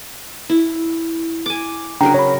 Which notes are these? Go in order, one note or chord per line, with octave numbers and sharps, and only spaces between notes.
E4
G#5 D6
C#3 F#3 D4 A#4 G5 A#5
C#5 B5